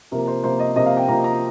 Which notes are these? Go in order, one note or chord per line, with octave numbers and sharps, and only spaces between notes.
C3 F3 A#3 A#4
C5
C3 F3 A#3 C5
D#5
C3 F3 A#3 D#5
F5
G5
C3 F3 A#3 A#5
A#5